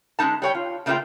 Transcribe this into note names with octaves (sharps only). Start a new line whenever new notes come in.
D3 G#3 C#4 D#4 A5
G3 C#5 G5
F4
C#3 A3 A#3 D#4 F4 G5